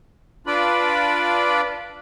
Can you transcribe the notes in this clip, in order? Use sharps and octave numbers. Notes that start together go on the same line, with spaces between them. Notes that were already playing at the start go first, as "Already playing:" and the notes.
D4 F4 B4 D5 B5